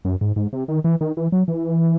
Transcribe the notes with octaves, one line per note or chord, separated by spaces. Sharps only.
F#2
G#2
G#2
C3
D#3
E3
D#3
E3
F#3
E3